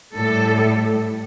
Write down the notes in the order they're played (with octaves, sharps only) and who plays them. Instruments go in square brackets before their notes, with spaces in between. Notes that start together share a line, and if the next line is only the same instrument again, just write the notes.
[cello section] A2 G3 A4